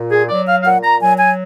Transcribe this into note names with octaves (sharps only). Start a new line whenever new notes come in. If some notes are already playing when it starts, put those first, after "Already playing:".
Already playing: A#2
G#4
F#3 D5
F5
F5
A#2 F#5
A#5
F#3 G#5
G#5